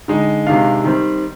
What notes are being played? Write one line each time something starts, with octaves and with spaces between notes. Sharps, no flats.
D3 G#3 D#4
C3 D#3 G#3 D4 F5
D#3 G3 C4